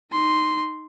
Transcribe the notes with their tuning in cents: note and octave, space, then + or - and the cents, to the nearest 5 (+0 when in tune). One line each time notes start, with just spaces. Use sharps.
D#4 +0 C6 +0